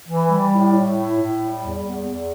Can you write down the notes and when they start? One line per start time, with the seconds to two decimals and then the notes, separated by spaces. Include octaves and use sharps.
0.08 E3
0.30 G3
0.52 A2
0.73 A2
0.95 E4
1.18 A2
1.39 G3
1.62 E2
1.84 E2
2.05 E2